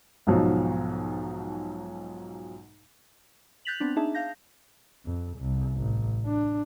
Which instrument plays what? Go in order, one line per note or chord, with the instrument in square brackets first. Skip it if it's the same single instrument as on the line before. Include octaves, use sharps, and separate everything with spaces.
[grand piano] B1 G#2 B2 F3 F#3
[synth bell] F#6 G6 A6 B6 F7 F#7
B3 C4 D4
D4 D#4 G#4 E5 A5
F5 G6 A#6
[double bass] F2
C2
A1
D4